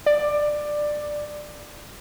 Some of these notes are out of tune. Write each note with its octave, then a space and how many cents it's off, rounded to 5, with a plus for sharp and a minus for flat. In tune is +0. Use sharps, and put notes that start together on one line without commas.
D5 +15